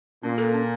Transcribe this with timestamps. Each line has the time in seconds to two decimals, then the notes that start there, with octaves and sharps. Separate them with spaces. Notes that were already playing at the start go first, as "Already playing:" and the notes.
0.23 A#2 C#4
0.38 A4
0.54 C#4